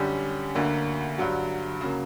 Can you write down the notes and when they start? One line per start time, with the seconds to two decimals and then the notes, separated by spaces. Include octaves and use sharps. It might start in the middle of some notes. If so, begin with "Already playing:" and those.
Already playing: F#2 D3 G3 C#4 G4
0.55 D2 D3 A#3
1.18 G2 D3 F#3
1.81 C#3 F#3 A#3